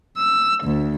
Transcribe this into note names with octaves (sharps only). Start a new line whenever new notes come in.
E6
D2